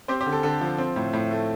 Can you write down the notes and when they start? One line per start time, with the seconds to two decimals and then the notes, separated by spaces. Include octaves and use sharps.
0.08 C4 G4 C5
0.21 G4 C5
0.26 D3
0.32 A4
0.43 D3 A4
0.61 F3
0.78 C4
0.96 A2
1.14 A2
1.31 A3